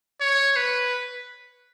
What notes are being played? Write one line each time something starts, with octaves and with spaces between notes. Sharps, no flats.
C#5
B4